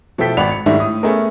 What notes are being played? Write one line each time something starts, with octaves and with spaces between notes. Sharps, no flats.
B2 F3 E4 A4 G5 B6
G#1 D5 F#5 B5 F7
C#7
G#2 D#3 G3 A3 D4 E4
A2 D#6
A3 B3 C#4 G#4 A#4